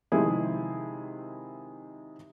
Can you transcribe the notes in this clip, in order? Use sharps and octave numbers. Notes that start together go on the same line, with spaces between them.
C3 D#3 F3 G#3 E4 G#4